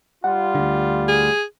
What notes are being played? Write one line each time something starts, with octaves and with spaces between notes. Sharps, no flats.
G3 F4 F#5
D2 D3
G#4